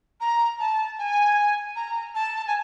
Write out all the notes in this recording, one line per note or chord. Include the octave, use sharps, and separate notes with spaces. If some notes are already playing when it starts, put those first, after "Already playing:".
A#5
A5
G#5
A#5
A5
G#5